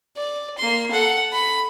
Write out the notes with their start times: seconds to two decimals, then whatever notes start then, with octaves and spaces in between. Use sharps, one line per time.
0.16 D5
0.58 A#3 C6
0.91 A4 F#5
1.32 B5